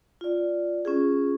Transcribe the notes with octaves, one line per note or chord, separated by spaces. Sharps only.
F4 D5
C#4 F4 G#4